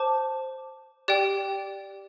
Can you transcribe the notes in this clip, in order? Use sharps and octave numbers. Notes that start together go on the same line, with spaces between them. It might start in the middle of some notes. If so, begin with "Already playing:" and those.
Already playing: C5 A5 D6
G4 D5 G5